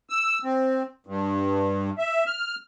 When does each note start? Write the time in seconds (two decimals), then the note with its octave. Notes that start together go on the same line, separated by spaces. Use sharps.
0.10 E6
0.44 C4
1.07 G2
1.98 E5
2.27 F6